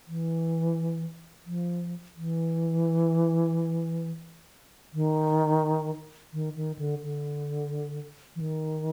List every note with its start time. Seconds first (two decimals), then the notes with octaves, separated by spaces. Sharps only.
0.07 E3
1.46 F3
2.16 E3
4.94 D#3
6.33 D#3
6.56 D#3
6.79 D3
7.02 D3
8.36 E3
8.41 D#3